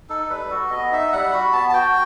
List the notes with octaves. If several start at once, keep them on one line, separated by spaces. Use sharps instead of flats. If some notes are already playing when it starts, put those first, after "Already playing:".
D#4 A4
G3 B4
F#4 A4
B3 D#5
D#4 E5
G3 F#5
F#4 B5
B3 A5
A5
F#4 G5